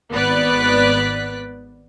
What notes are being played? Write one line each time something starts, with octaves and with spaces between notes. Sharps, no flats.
G#1 B3 B4 D5 F#6 B6